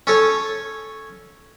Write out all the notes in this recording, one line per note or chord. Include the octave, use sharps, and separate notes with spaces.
C#4 A4 C#5